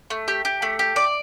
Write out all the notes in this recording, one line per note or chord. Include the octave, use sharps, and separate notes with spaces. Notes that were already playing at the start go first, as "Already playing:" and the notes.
A3
G4
G4
A3
G4
D5